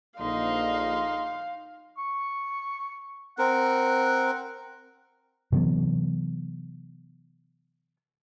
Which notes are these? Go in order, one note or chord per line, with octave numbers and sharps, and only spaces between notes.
A#1 D3 D#4 D#5 F5 C6
C#6
C4 A#4 F#5
C3 E3 F#3 B3